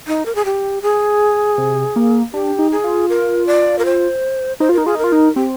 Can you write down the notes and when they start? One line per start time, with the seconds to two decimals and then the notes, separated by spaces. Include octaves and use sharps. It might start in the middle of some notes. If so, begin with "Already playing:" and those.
0.07 D#4
0.26 A#4
0.35 G#4
0.45 G4
0.82 G#4
1.58 C3
1.96 A#3
2.33 D4 G4
2.59 D#4
2.72 G#4
2.84 F4
3.09 A#4
3.47 D5
3.79 A#4
3.85 C5
4.60 D#4 C5
4.69 F4
4.73 D#4 A#4
4.86 F4 G#4
4.95 D#4 A#4
5.04 F4
5.12 D#4
5.35 C4 G4